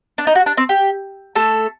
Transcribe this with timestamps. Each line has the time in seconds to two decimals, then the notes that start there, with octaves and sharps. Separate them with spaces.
0.18 D4
0.27 D#4
0.35 F#4
0.46 D4
0.57 C4
0.69 G4
1.35 A3 A4